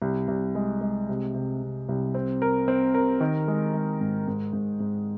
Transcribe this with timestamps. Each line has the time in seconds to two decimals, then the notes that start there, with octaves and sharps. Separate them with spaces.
0.02 C2
0.28 C2
0.55 G#3
0.81 G#3
1.09 C3
1.34 C3
1.62 C3
1.89 C2
2.14 C4
2.42 A#4
2.68 C4
2.94 A#4
3.20 D#3
3.48 G#3
3.74 G#3
4.01 G#2
4.27 G#2
4.53 G#2
4.80 G#2